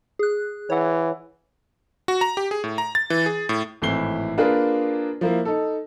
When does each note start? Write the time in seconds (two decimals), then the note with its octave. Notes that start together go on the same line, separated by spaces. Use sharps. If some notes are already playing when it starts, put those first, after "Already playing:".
0.19 G#4 F#6
0.70 E3 C#5 F#5
2.08 F#4
2.21 A#5
2.37 G4
2.51 G#4
2.64 A2
2.78 A#5
2.95 A6
3.10 E3
3.26 G#4
3.49 A2
3.82 G#1 A2 E3 E4 C7 G7
4.38 A#3 D4 F4 G#4 A#4 B4
5.21 F3 A#3 E4
5.45 D#4 A4